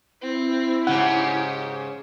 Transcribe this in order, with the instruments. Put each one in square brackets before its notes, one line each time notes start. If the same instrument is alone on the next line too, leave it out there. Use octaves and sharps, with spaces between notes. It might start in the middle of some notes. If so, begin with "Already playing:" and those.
[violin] C4 [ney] E4
[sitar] G#2 C#3 [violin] G4 [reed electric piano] F#5